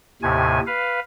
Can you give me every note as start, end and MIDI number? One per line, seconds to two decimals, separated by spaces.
0.22 0.60 39
0.22 0.60 45
0.22 0.60 48
0.22 0.60 80
0.66 1.00 71
0.66 1.00 77